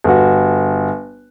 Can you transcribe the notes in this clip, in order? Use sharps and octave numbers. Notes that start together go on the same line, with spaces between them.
G1 F#4